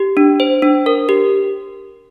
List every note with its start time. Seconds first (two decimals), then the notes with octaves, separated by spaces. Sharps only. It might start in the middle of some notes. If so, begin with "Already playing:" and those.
Already playing: G4
0.17 D4
0.40 C5
0.62 D4
0.86 A#4
1.09 G4